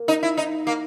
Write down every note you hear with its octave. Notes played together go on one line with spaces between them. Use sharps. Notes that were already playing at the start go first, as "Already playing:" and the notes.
Already playing: A#3
D#4
E4
D#4
A#3